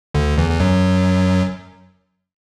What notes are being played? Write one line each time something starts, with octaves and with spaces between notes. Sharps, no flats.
D2 D3
E2 E3
E3
F#2 F#3